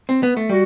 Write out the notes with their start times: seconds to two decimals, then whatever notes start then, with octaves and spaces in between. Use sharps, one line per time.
0.09 C4
0.23 B3
0.37 A3
0.49 G3 F#4